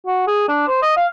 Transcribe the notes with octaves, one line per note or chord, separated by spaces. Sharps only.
F#4
G#4
D4
C5
D#5
F5